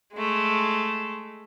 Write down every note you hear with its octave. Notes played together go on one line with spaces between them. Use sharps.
G#3 A3